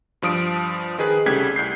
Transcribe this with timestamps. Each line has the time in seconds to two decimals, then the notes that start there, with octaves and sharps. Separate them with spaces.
0.22 G2 F3 D#6 D7
0.98 D#3 D#4 G#4 B4
1.26 C2 C#3 A3 G4 G#6 B6
1.56 C2 G6 C7